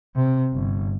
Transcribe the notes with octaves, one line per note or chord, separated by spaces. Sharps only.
C3
G1